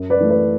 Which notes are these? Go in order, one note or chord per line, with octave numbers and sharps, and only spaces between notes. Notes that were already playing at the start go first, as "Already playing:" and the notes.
Already playing: F#2
B4 D5
E3 A3
B4 D5